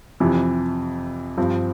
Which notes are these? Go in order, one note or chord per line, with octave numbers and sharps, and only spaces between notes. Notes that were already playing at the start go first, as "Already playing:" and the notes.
F2 C3 E3
G2 F3 C4